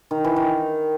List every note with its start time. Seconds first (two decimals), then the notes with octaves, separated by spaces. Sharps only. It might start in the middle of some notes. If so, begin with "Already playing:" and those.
0.11 D#3
0.24 E3
0.36 D#3